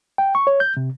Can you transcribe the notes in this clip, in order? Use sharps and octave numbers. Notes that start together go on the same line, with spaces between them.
G5
C#6
C#5
G6
C3